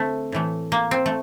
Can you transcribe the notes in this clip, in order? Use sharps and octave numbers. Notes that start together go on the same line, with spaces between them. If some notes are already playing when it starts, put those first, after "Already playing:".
Already playing: D3 A3 C4
A2 E3 A3
A#3
C4
A3